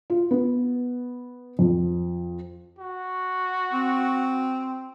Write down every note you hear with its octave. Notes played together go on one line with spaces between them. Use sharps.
F4
B3
F2
F#4
C4